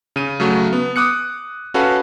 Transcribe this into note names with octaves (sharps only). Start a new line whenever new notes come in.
C#3 D#7
C#3 F#3 A3 F#4
B3
D6 D#6 F#6 C#7
C#4 F#4 A4 B4 F5